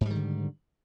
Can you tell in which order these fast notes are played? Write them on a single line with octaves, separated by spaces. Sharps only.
G#2 G3 D#3 D3